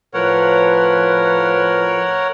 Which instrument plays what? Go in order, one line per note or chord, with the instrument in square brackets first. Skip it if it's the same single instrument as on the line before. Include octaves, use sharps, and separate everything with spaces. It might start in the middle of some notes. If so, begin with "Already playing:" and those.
[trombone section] A2 F3 B4 [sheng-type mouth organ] A#4 C#5 F#5